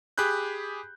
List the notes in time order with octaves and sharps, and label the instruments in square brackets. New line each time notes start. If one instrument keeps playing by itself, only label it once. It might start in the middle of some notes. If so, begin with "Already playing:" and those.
[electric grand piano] G4 G#4 B5 F#6 G6